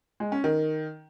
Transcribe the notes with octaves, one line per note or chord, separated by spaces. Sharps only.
G#3
C#4
D#3